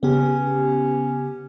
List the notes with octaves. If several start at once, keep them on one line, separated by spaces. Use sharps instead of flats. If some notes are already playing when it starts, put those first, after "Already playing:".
C#3 B3 C#4 G4